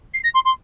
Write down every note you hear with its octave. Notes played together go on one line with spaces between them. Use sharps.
C7
A#6
C6
C6